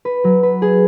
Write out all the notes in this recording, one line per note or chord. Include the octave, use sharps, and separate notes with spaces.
B4
F#3
B4
G#4